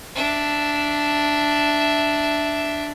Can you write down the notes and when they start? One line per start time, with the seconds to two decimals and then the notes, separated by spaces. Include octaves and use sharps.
0.15 D4 E5